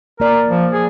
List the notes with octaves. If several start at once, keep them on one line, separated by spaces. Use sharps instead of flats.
A#3 A#4 D5
F3
G#4